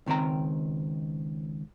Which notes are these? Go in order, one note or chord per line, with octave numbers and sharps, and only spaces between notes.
C#2 D#3 C4 G5 A#5